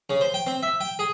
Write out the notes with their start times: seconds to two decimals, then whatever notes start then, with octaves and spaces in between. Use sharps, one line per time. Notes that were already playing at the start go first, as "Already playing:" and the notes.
0.10 C#3
0.21 C5
0.34 G5
0.47 C4
0.63 E5
0.81 G5
0.99 G#4